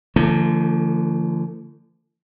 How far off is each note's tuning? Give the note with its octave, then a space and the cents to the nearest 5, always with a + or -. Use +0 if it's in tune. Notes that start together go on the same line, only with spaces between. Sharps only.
D3 +0 F3 -40 A3 +45